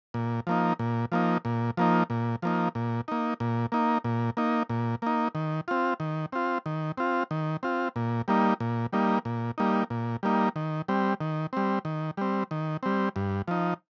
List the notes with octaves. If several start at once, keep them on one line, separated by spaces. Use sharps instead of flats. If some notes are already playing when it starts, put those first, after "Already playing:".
A#2
F3 A#3 D#4
A#2
F3 A#3 D#4
A#2
F3 A#3 D#4
A#2
F3 A#3 D#4
A#2
A#3 D#4
A#2
A#3 D#4
A#2
A#3 D#4
A#2
A#3 D#4
D#3
C4 F4
D#3
C4 F4
D#3
C4 F4
D#3
C4 F4
A#2
G3 A#3 D#4
A#2
G3 A#3 D#4
A#2
G3 A#3 D#4
A#2
G3 A#3 D#4
D#3
G3 C4
D#3
G3 C4
D#3
G3 C4
D#3
G3 C4
G2
F3 D#4